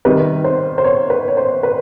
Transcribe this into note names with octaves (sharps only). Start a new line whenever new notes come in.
C3 D#3 G3 B4
C5
C5
C#5
B4
C#5
C5
B4